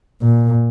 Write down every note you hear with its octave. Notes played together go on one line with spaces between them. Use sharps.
A#2